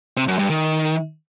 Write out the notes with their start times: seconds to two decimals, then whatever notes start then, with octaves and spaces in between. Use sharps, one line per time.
0.17 C3
0.28 F#2
0.39 G2
0.50 D#3